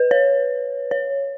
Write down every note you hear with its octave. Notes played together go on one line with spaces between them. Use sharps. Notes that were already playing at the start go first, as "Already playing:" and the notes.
Already playing: B4
C#5
C#5